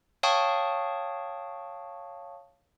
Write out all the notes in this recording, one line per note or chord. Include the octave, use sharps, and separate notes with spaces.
C#5 F5 G5 A5 C#6 D#6